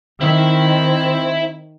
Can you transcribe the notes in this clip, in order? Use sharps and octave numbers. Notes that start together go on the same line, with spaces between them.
D#3 C4 E4 E5